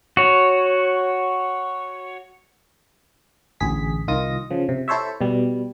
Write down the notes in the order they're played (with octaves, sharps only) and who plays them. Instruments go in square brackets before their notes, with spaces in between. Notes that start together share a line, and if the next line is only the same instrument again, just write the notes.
[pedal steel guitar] F#4 C#5
[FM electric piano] A1 D2 G#4 B6
C2 D#3 F4 D#5 D#6 A#6
C#3 F3
C3
E4 A4 C5 C#5 E5
B2 G3